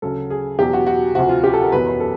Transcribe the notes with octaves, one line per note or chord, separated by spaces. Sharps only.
D2 C#3 F#3 A4
G#4
E2 B2 F#3 G4
F#4
F#4
D2 C3 F3 F#4
F4
G4
A4
A#4
F#1 E2 B2 F#3 B4
B4
A4